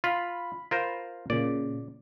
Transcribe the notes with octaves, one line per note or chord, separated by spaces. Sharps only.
F4 B5
F4 A#4 C5
A#2 C#3 D5